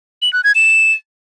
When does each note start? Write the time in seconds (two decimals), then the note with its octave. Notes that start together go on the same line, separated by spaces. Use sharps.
0.22 F#7
0.33 F#6
0.44 G#6
0.55 E7